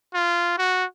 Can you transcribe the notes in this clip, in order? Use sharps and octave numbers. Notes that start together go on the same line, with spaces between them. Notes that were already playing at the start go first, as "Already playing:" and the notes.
F4
F#4